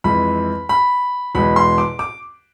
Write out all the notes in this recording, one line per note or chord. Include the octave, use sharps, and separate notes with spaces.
F2 E3 G#3 B5
B5
E2 B2 G#3 B5
C6
D6
D6